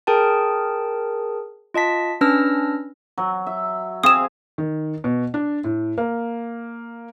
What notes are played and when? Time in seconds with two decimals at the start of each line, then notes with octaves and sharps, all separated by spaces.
0.07 G#4 A#4 G5 A5
1.74 F4 D#5 A5 B6
2.21 C#4 D4 B4 E6 F6 A#6
3.18 F#3
3.47 E5
4.04 C4 G#4 F5 D#6 E7
4.58 D#3
5.04 B2
5.34 D4
5.64 A2
5.98 A#3